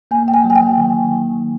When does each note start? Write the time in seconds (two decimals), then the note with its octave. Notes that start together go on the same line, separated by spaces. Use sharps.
0.11 A#3 G#5
0.28 G5
0.34 G#5
0.44 F#3
0.50 G#5
0.55 G5
0.78 D#3
1.11 D#3